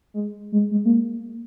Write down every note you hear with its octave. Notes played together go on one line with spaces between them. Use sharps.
G#3
G#3
G#3
A#3